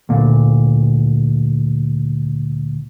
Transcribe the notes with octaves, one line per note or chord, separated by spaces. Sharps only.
D2 A#2